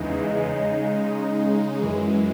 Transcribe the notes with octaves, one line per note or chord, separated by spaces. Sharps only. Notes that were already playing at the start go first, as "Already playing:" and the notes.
Already playing: E2 C#3 E3 G#3 D#4
C#3 G#3 D#4
F#2 E3 G#3